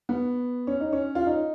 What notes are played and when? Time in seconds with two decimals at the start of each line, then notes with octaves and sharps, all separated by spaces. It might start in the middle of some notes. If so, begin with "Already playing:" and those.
0.09 B3
0.67 C#4
0.80 D#4
0.93 C#4
1.15 F4
1.27 D#4